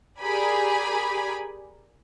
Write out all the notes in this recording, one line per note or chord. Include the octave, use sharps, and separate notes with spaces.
G4 G#4 A#4 D5 G#5 B5